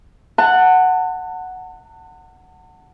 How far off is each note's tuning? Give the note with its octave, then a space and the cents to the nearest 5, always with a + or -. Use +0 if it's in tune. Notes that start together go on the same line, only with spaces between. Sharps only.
F#5 +0 A5 +35